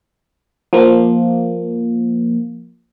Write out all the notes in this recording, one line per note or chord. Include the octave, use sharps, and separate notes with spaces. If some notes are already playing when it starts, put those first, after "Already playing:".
F3 A#3